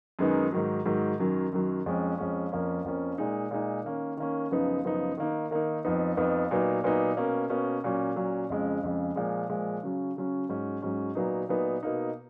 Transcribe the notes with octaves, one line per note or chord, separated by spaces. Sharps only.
F#2 D#3 G#3 B3 D#4
G#2 D#3 F#3
G#2 D#3 F#3
F#2 D#3 F#3
F#2 D#3 F#3
F2 F3 G#3 C#4
F2 F3 G#3 C#4
F2 F3 A#3 C#4
F2 F3 A#3 C#4
A#2 G#3 D#4
A#2 G#3 D#4
D#3 A#3 C#4
D#3 A#3 C#4
F#2 C#3 F3 B3 D#4
F#2 C#3 F3 B3 D#4
D#3 A#3 D#4
D#3 A#3 D#4
F2 F3 B3 D#4
F2 F3 B3 D#4
A#2 F#3 B3 D#4
A#2 F#3 B3 D#4
B2 A#3 C#4
B2 A#3 C#4
A#2 F#3 C#4
A#2 F#3 C#4
F2 C#3 F3 G#3
F2 C#3 F3 G#3
A#2 F3 G#3
A#2 F3 G#3
C#3 F#3 C#4
C#3 F#3 C#4
G#2 F#3 C#4
G#2 F#3 C#4
A#2 F#3 B3 D#4
A#2 F#3 B3 D#4
B2 A#3 D#4